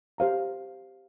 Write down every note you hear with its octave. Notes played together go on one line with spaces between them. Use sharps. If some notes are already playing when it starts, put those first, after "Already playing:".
G4 C5 F5 A#5